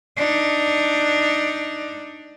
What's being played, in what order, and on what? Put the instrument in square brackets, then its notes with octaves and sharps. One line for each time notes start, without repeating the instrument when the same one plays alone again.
[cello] D4 D#4